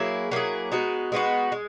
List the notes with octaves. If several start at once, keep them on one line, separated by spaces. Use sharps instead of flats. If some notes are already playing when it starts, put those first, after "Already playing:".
Already playing: F#3 A#3 E4 G#4
F#3 A#3 E4 G#4
G#3 B3 D#4 F#4
G#3 B3 D#4 F#4
G#3